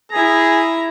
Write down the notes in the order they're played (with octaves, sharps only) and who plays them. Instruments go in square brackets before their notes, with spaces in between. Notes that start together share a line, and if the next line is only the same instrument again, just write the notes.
[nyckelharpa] E4 A#5 [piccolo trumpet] G#4